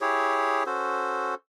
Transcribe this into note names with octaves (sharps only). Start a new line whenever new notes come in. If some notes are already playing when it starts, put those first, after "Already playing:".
E4 G4 G#4 C#5
C#4 F#4 A4 C5